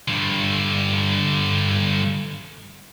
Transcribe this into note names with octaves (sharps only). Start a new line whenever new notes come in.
G2 D3